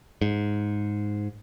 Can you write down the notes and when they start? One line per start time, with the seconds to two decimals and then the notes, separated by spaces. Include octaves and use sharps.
0.22 G#2